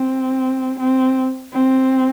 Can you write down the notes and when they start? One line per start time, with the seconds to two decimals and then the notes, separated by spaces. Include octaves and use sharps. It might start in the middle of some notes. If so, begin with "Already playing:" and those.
Already playing: C4
0.80 C4
1.53 C4